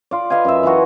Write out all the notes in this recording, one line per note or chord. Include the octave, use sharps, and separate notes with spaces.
F4 D5
B4 D#5 F5 G#5
F#2 E5
E3 D#4 F4 F#4